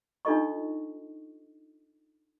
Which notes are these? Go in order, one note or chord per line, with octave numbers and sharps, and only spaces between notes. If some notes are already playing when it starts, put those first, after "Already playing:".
D4 D#4 F4 A4 D#5 C#6